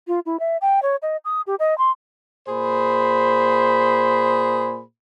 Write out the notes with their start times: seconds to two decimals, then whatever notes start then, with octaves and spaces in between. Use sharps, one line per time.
0.08 F4
0.26 E4
0.40 E5
0.61 G5
0.82 C#5
1.02 D#5
1.25 D#6
1.47 G4
1.59 D#5
1.78 C6
2.48 A#2 G#4 C5 B5